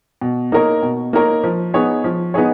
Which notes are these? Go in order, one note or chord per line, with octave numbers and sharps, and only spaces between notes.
B2
A#3 D#4 A#4 C#5
B2
A#3 D#4 A#4 C#5
F3
B3 D#4 G#4 C#5
F3
B3 D#4 G#4 C#5